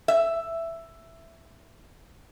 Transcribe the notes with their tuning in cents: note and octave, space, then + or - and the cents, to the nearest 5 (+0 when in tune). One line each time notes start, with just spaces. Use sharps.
E5 +5